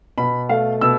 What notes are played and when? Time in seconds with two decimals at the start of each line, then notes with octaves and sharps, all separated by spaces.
0.18 B2 B5
0.49 A3 F5
0.81 B2 E6